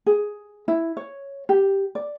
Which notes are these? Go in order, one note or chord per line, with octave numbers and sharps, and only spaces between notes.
G#4
E4
C#5
G4
D5